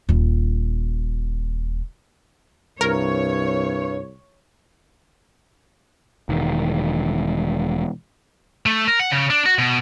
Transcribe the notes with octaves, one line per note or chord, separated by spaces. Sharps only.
D#1 F4
C2 G2 A#4 C#5
E1 D#3
A3
A#4
F#5
C#3
D4
F#4
B2